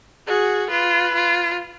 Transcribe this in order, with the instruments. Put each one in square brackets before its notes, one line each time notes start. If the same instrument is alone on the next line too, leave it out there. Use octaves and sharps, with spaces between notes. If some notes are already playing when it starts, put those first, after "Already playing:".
[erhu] F#4 [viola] G#4
[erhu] F4 [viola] B4
[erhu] F4